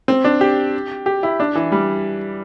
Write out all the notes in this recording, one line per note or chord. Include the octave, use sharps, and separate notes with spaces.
C4
D4
G4
G4
E4
D4
E3
G3